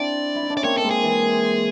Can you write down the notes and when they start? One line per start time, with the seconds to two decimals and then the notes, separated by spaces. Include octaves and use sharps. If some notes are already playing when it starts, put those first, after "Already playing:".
Already playing: C4 D4 E4 D5
0.35 E4
0.43 D#4
0.50 D4
0.57 C#4 D5
0.64 A#3 C4 C#5
0.77 A4
0.84 G#3 A#3
0.91 G#4
1.03 E3